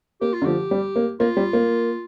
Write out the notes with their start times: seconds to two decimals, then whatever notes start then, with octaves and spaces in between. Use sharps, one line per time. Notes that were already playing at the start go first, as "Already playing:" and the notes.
0.21 A#3 G4
0.33 F4
0.42 D3
0.45 F3 G4
0.71 G3
0.96 A#3
1.20 A#3 F4
1.37 G3
1.53 A#3